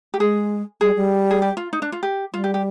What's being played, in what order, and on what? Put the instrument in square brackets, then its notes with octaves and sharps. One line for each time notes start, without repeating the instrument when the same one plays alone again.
[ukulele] G4
[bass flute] G#3 [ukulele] G#4
[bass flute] G3 [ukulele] G#4
[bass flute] G3
[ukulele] G#4
G4
F4
D#4
D4
F4
G4
[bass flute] G3 [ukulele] F4
[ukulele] G4
G4